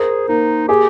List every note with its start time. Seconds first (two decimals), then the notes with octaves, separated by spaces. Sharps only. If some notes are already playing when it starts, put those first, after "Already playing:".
Already playing: G#4 A#4 C5
0.28 A#3 D#4
0.69 G4 G#4